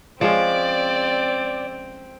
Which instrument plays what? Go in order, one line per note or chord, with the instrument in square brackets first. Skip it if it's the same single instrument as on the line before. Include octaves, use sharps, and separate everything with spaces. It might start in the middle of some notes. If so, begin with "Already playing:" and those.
[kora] F3 G#3 C#4 [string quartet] C4 [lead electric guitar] D5